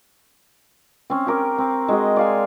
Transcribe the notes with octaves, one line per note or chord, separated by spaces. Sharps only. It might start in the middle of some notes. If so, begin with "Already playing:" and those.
C4 C#4
G4 A#4 D6
C4
G#3 F#4 D#5
D5 F5 G#5